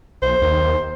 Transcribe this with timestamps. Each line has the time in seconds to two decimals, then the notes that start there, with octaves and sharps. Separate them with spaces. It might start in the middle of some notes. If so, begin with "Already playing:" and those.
0.22 B1 C5
0.42 D#2